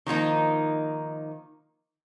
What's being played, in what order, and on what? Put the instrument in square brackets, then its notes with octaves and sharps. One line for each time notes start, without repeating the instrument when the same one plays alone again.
[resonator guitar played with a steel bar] D#3 F3 A#3 D#4